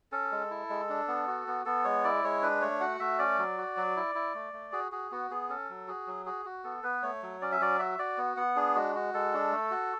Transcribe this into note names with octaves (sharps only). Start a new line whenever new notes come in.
C#4 A4
G#3
E4
G#3
D4
B3
F#4
B3
B3 A4
G#3 C#5
E4 D5
G#3 C#5
D4 B4
A3 C#5
F#4 F#5
A3 E5
C#4 D5
F#3
F#4
F#3
E4
E4
A3
A3
F#4 G#4
F#4 G#4
B3 F#4
B3 G#4
C#4 A4
F#3
F#4 G#4
F#3
F#4 G#4
F#4
B3 A4
B3 B4
A3 C#5
F#3
C#4 D5
E5
F#3 D5
F#4 E5
F#4 D5
B3
B3 F#5
D4 G#4
G#3 F#4
F#4
G#3 A4
D4
A3
F#4